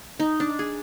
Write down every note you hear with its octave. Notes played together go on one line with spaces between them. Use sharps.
D#4
D4
G#4